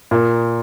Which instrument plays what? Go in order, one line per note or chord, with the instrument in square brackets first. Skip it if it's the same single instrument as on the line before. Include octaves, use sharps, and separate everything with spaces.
[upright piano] A#2